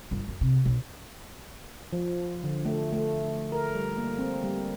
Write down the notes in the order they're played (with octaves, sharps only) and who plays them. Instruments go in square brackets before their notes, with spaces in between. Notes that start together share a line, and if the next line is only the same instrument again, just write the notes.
[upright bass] G1
F#2
C3
B1
[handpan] F3
D3
A3
A3
A#4
G3
A#3
C4
G3